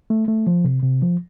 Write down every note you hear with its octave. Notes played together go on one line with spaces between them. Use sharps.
A3
A3
F3
C3
C3
F3